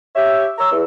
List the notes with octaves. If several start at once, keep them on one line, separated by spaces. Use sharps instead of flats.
G4 C#5 E5
C#5 A#5 E6
E2